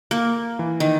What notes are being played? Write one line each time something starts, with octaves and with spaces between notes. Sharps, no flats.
A#3
E3
D#3